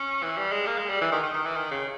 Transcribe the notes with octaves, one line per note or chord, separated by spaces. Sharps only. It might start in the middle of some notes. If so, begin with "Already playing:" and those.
Already playing: C#4
E3
G3
G#3
A#3
G#3
G3
E3
D#3
D#3
D#3
E3
D#3
C#3